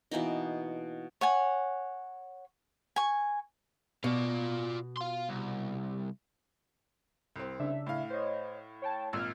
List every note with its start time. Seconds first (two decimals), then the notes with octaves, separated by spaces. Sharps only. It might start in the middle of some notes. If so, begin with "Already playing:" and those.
0.11 B2 E3 A#3 D#4
1.21 C#5 F#5 G#5
2.96 G#5 C#6
4.04 B2 F4 D5
4.97 F5 C6
5.29 C2
7.36 C2 C4
7.59 C#3 D4 E5
7.86 A2 F5
8.10 C5 C#5 D#5
8.82 C#5 G5 A5
9.13 G#1 A#2 E6 F6 G#6